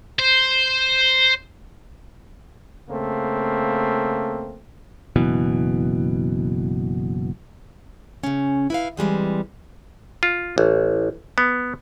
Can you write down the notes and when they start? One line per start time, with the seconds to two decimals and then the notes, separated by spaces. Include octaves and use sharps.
0.19 C5
2.89 C#3 A3 A#3 C4
5.16 F#1 B2 E3
8.23 C#3 C#4
8.70 E4 B4 F5
8.97 E3 G3 G#3 C4
10.23 F4
10.58 A1
11.38 B3